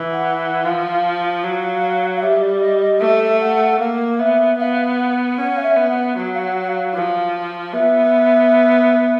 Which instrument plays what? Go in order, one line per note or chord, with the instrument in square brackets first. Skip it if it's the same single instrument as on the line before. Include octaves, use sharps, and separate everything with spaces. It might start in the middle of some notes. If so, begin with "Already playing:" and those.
Already playing: [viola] E3
[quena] F#5
F#5
[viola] F3 [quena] F5
[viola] F#3
[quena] F5
[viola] G3 [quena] E5
[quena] D5
D#5
D#5
[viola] A3 [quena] E5
[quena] F#5
[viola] A#3 [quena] F5
[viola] B3 [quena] E5
[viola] B3 [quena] F5
[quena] F#5
[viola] C#4 [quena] F#5
[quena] F5
E5
[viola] B3
[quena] F#5
[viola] F#3
[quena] F5
F#5
F#5
F5
[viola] F3
[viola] B3 [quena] E5